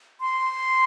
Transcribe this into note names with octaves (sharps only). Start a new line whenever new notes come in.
C6